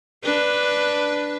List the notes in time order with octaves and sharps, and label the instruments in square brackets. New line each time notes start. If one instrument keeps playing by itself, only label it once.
[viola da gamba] D4 B4